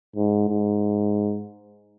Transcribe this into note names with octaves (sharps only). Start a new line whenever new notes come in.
G#2
G#2